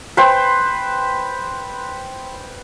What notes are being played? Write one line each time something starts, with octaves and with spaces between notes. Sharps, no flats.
B4 C5 G5